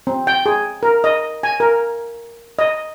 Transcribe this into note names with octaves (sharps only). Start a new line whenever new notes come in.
C4
G5
G#4
A#4
D#5
G#5
A#4
D#5